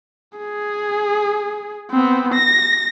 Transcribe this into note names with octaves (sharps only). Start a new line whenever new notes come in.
G#4
B3 C4
A#6